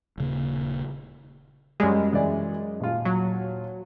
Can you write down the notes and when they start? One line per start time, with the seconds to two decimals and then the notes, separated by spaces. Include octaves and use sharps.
0.18 D#1 C#3 A#3
1.80 F#2 G3 G#3
2.13 E3 D5
2.80 D#1 F4
3.05 F#3